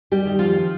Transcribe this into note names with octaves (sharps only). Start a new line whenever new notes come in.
G3 G4
D#3
F3 F4